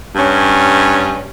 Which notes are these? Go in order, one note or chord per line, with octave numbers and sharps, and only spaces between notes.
G2 C#4